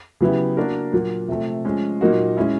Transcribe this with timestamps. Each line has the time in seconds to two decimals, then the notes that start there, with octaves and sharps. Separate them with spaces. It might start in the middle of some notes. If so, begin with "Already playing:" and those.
0.20 C#3 F#3 B3 E4 G4
0.57 A#3 D4 F#4 A#4
0.93 A#2 F#3 A#3
1.28 C3 F3 A3
1.65 F3 G#3 C#4
2.01 A#2 F#3 A#3 D#4 F#4
2.37 G#3 C#4 E4